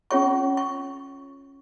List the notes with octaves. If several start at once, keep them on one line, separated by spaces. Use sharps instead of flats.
C#4 F4 G#4 C#5 C#6
C#6